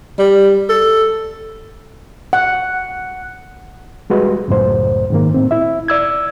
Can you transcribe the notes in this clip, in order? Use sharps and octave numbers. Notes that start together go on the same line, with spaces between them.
G3
A4
F#5
G3 G#3 F#4 B4
C#2 F#2 A2 C5
G#2 D#3 A#3
A2 C4
E4 E5
D5 E6 G#6